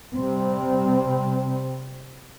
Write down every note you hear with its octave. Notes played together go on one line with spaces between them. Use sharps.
C3 G3 C4